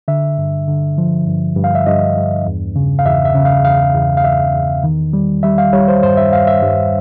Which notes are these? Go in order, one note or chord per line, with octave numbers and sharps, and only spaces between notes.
D3 E5
G2
D3
F3
G2
G2
F5
E5
G2 D#5
G2
E2
C#3
F5
E2 E5
E5
C#3
F5
E2 F5
E2
F5
E2 E5
E2
D#3
G3
G3 E5
F5
G3 C#5
C5
G2 C5
E5
G2 F5
E5
G2